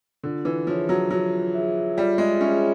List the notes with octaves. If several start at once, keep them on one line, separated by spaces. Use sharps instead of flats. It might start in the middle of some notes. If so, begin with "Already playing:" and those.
D3 F4
E3
F3 G#4 C#5 E5
F#3
F#3 F4
G#4 C#5 E5
G3 F4
G#3
C#4 G#4 C#5 E5